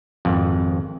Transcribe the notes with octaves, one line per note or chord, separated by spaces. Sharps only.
G#1 F2